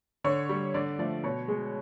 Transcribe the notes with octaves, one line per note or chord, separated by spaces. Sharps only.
D3 C#5
G3
D3 D5
F3 A3 D5
B2 C#5
G#3